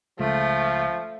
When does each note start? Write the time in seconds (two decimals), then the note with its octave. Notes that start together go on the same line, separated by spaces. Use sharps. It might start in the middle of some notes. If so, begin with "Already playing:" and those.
0.19 C#2 F3 A3